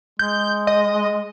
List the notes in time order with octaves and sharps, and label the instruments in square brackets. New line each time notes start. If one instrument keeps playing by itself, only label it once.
[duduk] G#3 [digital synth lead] G6
[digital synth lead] D#5